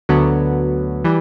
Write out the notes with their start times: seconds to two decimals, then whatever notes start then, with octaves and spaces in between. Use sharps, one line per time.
0.09 D2 D3 F#3 B3
1.05 E3 G3